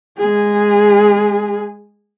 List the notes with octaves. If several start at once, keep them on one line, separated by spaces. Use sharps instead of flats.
G#3 G#4